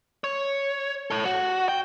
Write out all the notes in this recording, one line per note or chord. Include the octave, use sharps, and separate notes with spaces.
C#5
A4 C#5
F#4
G5